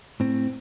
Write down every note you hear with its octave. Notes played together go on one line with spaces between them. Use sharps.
A2 C4